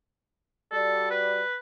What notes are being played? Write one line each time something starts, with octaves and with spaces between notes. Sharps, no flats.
G3 F#4 A4 D5
B4